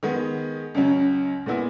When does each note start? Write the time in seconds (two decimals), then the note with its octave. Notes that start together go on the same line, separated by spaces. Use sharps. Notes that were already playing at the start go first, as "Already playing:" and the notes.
0.03 D#3 G#3 B3
0.74 C#2 C#3 F#3 C#4
1.46 A#2 G#3 B3 E4